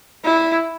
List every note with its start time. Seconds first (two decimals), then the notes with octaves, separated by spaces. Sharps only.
0.24 E4